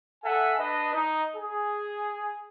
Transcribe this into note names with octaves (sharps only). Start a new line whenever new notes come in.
A4 E5 F#5 G#5
D4 B4 D#5
D#4 D#5
G#4